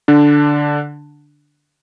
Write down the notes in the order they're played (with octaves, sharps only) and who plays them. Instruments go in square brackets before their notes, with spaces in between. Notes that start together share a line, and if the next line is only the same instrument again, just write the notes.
[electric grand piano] D3 D4